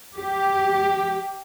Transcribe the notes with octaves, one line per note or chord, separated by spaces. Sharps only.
G4